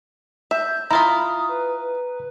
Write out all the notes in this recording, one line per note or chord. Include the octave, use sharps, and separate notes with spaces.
E5 G6
E4 F4 A#5 B5 D#6
B4